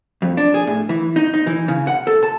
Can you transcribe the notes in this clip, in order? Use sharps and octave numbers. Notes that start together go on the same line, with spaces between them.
F2
D4
G#4
A2
E3
D#4
D#4
E3
C#3
F#5
A4
A5